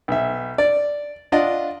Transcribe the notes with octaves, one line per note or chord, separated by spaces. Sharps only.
B1 E5
D5
D4 F4 D5 D#5 F#5